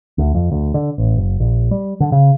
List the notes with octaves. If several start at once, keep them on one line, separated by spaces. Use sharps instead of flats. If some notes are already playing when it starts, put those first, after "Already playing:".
D2
F2
D2
D3
A1
F#1
A#1
G3
D3
C#3